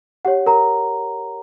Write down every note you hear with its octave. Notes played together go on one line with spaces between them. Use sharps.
G4 C#5 F#5
A#4 A#5